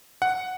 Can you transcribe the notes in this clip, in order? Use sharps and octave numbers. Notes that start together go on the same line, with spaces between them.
F#5